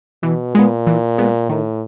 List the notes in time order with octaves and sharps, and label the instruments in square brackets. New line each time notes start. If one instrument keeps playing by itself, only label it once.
[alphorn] B2 [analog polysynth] E3
[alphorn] A#2 [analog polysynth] G#3 B3
[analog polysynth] E3
G#3 B3
[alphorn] A2 [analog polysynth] D#3